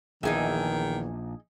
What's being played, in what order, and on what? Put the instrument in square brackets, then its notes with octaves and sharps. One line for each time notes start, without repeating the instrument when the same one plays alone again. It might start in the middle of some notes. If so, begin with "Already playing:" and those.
[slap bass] A#1 [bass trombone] E2 [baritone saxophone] D#3 [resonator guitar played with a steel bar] D#4 G#4 E5